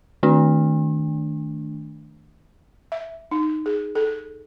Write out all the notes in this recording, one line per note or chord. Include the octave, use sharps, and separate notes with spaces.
D#3 A3 D4
E5
D#4
G#4
A4